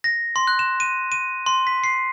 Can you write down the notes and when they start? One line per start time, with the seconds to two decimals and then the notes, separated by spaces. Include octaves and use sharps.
0.04 A#6
0.36 C6
0.47 F#6
0.59 E7
0.80 D#7
1.12 D#7
1.46 C6
1.67 B6
1.84 C7